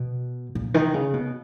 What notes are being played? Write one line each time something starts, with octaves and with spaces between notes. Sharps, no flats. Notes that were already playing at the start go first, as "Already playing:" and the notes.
Already playing: B2
A#2
D#3
C#3
B2